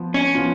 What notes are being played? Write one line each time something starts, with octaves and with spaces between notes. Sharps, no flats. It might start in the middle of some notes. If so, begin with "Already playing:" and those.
Already playing: F3 B3 F4
C#4
F3 B3 F4